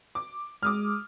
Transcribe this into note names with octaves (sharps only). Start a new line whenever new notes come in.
D6
G#3 D6 D#6 F6